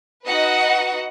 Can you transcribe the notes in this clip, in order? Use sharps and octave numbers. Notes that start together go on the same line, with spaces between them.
D#4 F#4 B4 D#5 F#5